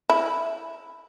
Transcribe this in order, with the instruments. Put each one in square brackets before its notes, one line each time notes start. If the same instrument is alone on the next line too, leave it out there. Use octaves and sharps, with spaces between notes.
[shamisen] E4